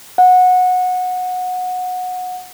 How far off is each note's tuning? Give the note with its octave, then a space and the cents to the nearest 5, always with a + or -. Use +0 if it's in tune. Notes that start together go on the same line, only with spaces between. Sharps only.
F#5 -20